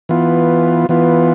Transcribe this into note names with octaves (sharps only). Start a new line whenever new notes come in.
E3 B3 F4
E3 B3 F4